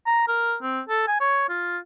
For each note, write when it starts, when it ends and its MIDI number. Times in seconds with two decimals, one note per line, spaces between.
0.06 0.26 82
0.28 0.55 70
0.62 0.81 60
0.89 1.03 69
1.07 1.16 80
1.20 1.45 73
1.49 1.78 65